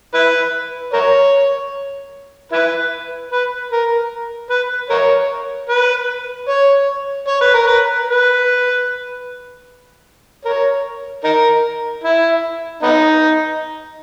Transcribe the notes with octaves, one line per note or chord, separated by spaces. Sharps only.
E4 B4
A#4 C#5
E4 B4
B4
A#4
B4
A#4 C#5
B4
C#5
C#5
B4
A#4
B4
B4
A#4 C#5
D#4 A#4
E4
B3 D#4